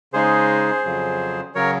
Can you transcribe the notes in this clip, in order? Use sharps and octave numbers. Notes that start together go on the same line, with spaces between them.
C#3 G#3 D#4 G#4 C5
F2 C#3 F#3
C#3 F#3 A#4 C#5